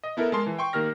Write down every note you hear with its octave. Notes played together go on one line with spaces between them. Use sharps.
D#5
B3 E4 A4 A#4
G#3 A#4 A5 C6 C7
E3
G5 C6 C#6
D#3 A#3 G4 F6 A#6